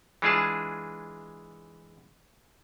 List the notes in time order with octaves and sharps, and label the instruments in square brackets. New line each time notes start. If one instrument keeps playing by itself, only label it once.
[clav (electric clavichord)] E3 G#3 D4 F4 G#4 A5